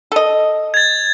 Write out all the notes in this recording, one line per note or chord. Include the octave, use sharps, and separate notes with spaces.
A4 D#5
G#6 A6